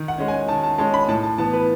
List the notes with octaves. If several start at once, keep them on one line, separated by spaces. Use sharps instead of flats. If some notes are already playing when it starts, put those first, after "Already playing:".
Already playing: D#3
F#5
G#3 C#4
G#5
D#3 A5
A5
G#3 C#4 A5
B5
A2 A5
A5
E3 B3 A5
B4